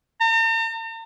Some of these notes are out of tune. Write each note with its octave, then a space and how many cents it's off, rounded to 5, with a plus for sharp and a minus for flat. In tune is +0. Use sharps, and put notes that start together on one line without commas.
A#5 -45